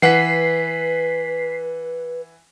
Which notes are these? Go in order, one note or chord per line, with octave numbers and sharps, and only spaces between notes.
E3 B4 F#5 B6 C7